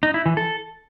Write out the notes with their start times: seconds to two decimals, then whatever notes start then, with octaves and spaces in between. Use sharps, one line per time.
0.03 D#4
0.14 E4
0.26 E3
0.37 A4